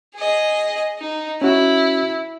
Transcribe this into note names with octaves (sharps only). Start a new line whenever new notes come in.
G#4 D#5
D#4
C#4 E4 F#4